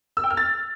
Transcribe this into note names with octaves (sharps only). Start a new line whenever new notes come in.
E6
G5
F6
A6